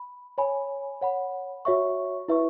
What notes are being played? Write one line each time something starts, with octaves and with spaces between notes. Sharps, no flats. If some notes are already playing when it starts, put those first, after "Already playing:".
Already playing: B5
C#5 G#5 B5
C#5 F#5 B5
F#4 C#5 E5 C#6
E4 B4 E5 C#6